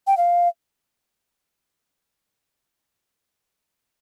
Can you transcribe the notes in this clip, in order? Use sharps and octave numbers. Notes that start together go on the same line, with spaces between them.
G5
F5